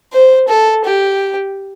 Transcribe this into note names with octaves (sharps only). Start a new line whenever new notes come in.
C5
A4
G4